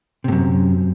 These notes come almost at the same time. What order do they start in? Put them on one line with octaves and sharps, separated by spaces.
C3 A2 F#2